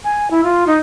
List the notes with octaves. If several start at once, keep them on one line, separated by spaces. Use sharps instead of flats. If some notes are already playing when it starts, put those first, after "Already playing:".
G#5
E4
F4
D#4